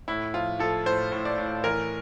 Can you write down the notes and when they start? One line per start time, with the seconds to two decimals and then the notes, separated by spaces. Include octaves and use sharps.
0.08 A2 E4
0.34 F3 F4
0.59 F3 A4
0.86 A2 C5
1.12 A2
1.25 D5
1.38 A2
1.64 E3 A#4